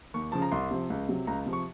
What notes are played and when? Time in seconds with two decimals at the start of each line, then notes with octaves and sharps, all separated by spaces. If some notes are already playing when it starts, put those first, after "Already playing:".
0.14 D#2 C#6
0.32 C#3 F3 A5
0.42 A#5
0.52 C2 C6
0.71 C3 F3
0.90 C#2
1.09 C3 F#3
1.27 C#2 A#5
1.46 C3 F3
1.53 C#6